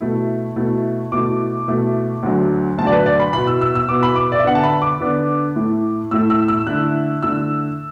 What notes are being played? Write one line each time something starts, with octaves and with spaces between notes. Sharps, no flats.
B2 A3 E4
B2 A3 E4
B2 A3 E4 D6
B2 A3 E4
D2 D3 F#3
D2 D3 F#3 A5
D5
B4
D5
B5
B2 B3 E4 B5
E6
E6
E6
B2 B3 E4 D6
B5
D6
D5
E5
D3 B3 D4 F#5
A5
B5
D6
D3 B3 D4
A2 A3 E4
A2 A3 E4 E6
E6
E6
D3 A3 E4 F#6
D3 A3 E4 E6